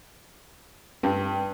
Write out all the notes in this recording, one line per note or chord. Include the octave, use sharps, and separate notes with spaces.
G2